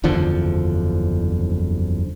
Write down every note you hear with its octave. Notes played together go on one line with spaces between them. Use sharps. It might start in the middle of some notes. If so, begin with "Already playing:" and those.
F#1 E2 D3 F3